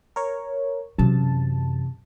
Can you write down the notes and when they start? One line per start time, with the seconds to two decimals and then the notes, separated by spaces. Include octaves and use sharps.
0.16 A#4 C#5
0.98 F#2 C3 E3 A5